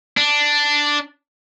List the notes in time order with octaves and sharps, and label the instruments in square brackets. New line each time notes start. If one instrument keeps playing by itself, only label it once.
[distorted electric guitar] D4